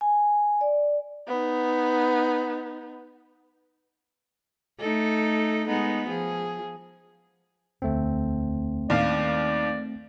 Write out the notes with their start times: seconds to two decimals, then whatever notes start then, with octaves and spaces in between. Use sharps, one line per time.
0.01 G#5
0.61 D5
1.28 B3 D#4
4.79 A3 D#4 A4
5.67 G#3 B3 D#4
6.09 F3 G#4
7.82 E1 D2 A3 C4
8.90 D#2 D#3 B3 D4 D5 F5